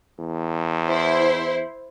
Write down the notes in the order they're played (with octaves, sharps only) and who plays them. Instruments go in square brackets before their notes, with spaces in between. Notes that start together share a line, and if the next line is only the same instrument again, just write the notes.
[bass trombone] E2
[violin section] E4 C5